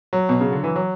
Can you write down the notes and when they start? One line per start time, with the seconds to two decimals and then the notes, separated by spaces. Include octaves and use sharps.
0.13 F#3
0.29 B2
0.40 C#3
0.52 D3
0.64 E3
0.76 F#3